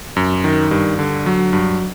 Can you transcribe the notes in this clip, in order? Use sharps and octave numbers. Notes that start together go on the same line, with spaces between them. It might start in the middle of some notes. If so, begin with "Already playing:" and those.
F#2
D#3
G2
D3
F#3
G2